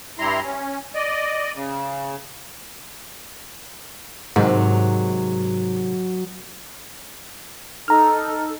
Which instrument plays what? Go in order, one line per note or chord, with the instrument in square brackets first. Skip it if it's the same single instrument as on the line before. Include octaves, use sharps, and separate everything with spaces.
[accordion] G2 G3 E4 A#5 C6
C#4
D5 D#5
C#3
[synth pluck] G#2 [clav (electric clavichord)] C3 D#3 G#3 [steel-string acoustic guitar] F#3
[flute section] D#4 A4 [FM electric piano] A#5 F6